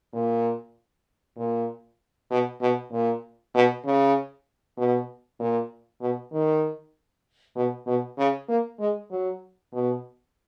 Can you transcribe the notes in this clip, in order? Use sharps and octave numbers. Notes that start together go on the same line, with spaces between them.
A#2
A#2
B2
B2
A#2
B2
C#3
B2
A#2
B2
D#3
B2
B2
C#3
A#3
G#3
F#3
B2